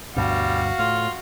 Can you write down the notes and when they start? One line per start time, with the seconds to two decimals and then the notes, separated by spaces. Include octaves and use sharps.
0.16 D2 G2 B2 G3 F#4 F5
0.79 A2 F4